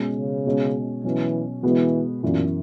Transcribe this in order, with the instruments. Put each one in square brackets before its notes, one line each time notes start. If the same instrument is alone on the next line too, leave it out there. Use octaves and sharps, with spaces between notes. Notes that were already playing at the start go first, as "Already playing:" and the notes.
Already playing: [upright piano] B2 G#3 C#4
[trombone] C#3
[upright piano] B2 G#3 C#4
[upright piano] B2 F#3 C#4 [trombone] E3
[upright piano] B2 G#3 B3 F#4 [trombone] E3
[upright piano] F#2 E3 B3 [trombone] A#2